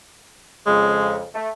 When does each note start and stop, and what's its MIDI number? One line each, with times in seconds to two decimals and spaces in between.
0.66 1.25 41
0.66 1.25 49
0.66 1.19 56
1.34 1.49 57